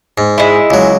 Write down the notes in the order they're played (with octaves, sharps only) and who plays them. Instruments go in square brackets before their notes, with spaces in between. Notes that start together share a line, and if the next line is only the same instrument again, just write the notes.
[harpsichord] G#2
[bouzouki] G#3 E4
[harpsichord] C#2 F#3